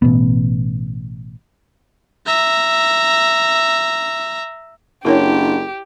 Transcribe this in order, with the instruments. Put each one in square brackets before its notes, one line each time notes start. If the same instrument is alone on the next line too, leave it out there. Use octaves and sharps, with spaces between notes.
[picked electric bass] A1 B2 B3
[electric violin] E5 A#5
[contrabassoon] F#1 [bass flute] D4 [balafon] E4 A#4 C#5 [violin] G4